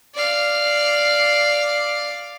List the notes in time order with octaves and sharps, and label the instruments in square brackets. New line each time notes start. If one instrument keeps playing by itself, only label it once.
[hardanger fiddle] D5 F5